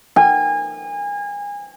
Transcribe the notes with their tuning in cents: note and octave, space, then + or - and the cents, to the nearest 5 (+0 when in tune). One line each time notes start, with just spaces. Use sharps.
G#5 -30